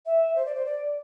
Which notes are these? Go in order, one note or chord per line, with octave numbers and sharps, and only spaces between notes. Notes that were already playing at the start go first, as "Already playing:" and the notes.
E5
C5
D5
C5
D5